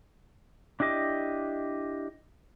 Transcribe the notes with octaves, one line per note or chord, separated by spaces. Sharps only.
D4 E4 G4 D#5 D6